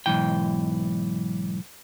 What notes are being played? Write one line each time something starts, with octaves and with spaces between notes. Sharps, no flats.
B1 G#2 E3 G5